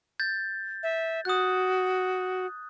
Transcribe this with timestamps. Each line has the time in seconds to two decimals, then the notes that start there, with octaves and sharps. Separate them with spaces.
0.20 G6 A6
0.83 E5
1.25 F#4 D#6 F#6